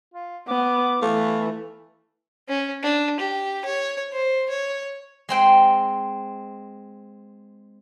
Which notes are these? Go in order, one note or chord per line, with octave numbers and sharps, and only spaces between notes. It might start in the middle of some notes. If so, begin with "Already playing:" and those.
F4
B3 D6
E3 A3 F5
C#4
D4
G4
C#5
C5
C#5
G#3 C4 G5